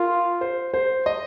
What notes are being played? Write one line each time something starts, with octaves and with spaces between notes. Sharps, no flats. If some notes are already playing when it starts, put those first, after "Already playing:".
Already playing: F4 A#4
C5
C5
D#5